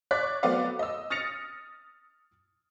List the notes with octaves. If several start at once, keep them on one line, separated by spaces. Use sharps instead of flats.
C#5 D5 F#6 B6
F#3 A3 B3 C4 D5 F5
D#5 E6
D#6 F6 A6 A#6 C#7 F7